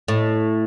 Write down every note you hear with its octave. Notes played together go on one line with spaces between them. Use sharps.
A2